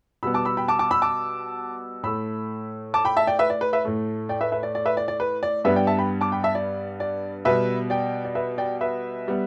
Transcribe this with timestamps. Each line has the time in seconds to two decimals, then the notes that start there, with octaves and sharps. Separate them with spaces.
0.23 B2 G3 B3 B5 E6
0.34 A5 D6
0.45 B5 E6
0.57 G5 B5
0.68 A5 D6
0.79 A5 D6
0.91 B5 E6
1.02 A5 D6
2.03 A2 A3 B5 E6
2.94 A5 D6
3.05 G5 B5
3.17 E5 A5
3.27 D5 G5
3.39 B4 E5
3.50 D5
3.61 B4
3.73 B4 E5
3.85 A2 A3
4.29 D5 G5
4.41 B4 E5
4.52 B4 E5
4.63 D5
4.75 D5
4.86 B4 E5
4.97 D5
5.08 D5
5.20 B4
5.43 D5
5.64 G2 G3 B3 B4 E5
5.76 D5 G5
5.87 E5 A5
5.98 G5 B5
6.21 A5 D6
6.32 G5 B5
6.43 E5 A5
6.55 D5
7.00 D5
7.45 B2 G3 B3 B4 E5
7.90 D5 G5
8.25 D5
8.35 B4 E5
8.58 D5 G5
8.81 B4 E5
9.28 G3 B3